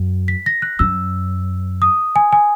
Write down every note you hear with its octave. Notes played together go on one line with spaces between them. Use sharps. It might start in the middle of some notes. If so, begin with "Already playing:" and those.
Already playing: F#2
B6
A#6
F#6
F#2 E6
D#6
G#5
G#5